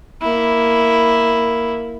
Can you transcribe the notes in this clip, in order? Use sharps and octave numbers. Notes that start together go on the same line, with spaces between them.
A#3 E4